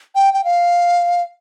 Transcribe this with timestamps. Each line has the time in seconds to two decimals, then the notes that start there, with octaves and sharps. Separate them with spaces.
0.16 G5
0.34 G5
0.44 F5